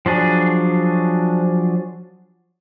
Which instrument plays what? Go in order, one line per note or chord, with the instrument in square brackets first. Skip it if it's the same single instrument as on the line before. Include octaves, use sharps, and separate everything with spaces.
[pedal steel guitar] F3 F#3 D4 G#4